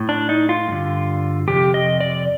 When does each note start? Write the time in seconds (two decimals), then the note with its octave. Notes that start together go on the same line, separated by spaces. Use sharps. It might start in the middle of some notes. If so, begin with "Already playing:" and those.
Already playing: A2
0.09 D4
0.29 D#4
0.49 F4
0.68 G2 D3
1.48 F2 C3 G4
1.74 D#5
2.01 D5